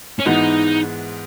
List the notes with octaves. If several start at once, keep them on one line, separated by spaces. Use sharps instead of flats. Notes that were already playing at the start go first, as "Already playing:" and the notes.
C#4
G#2 E3 G#3 B3 D#4